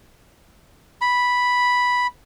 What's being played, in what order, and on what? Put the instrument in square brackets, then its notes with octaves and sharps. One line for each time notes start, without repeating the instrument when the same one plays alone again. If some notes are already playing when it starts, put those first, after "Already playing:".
[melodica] B5